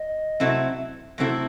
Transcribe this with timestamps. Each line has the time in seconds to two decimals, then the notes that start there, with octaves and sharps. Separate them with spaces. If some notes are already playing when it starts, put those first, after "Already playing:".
Already playing: D#5
0.40 C3 F#3 A3 C4 E4
1.18 C3 F#3 A3 C4 E4